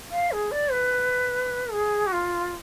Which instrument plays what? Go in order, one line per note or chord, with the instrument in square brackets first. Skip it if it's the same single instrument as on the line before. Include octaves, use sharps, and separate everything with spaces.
[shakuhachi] F5
G#4
D5
B4
G#4
F#4
F4